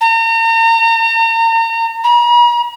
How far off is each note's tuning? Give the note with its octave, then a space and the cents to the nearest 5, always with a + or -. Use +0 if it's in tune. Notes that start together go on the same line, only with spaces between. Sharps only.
A#5 -40
A#5 +45